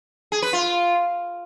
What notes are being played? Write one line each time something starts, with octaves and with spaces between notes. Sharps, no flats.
G#4
B4
F4